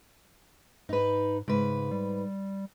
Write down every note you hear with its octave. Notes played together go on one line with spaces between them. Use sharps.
G#2 D#4 B4
G#2 C#3 B4
G3